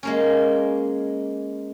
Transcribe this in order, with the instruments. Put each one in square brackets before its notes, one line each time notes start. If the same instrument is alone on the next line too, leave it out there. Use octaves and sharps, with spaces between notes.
[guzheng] G#3 A#3 C#4